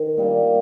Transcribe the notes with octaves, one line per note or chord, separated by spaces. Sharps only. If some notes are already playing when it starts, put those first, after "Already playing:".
Already playing: D#3
A#2 G3 A#3 D4